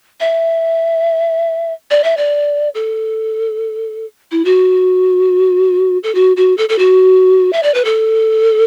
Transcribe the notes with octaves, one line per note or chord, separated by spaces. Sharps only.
E5
D5
E5
D5
A4
E4
F#4
A4
F#4
F#4
A4
A4
F#4
E5
D5
B4
A4